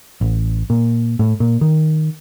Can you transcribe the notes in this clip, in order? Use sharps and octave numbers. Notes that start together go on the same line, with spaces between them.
A1
A#2
A2
A#2
D#3